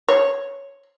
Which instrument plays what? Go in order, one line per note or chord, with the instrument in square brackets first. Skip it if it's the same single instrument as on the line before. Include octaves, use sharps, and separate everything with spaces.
[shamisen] C#5